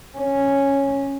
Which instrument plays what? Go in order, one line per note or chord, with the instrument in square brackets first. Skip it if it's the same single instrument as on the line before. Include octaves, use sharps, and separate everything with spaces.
[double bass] C#4